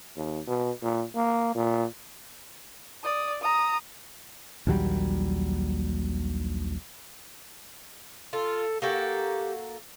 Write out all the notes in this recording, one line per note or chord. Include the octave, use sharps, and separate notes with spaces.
D#2
B2
A#2
A#3
A#2
D5 D#6
A#5 D#6
A#1 D#2 F#3 G3
F4 A4
A#3 F#4 G4 A4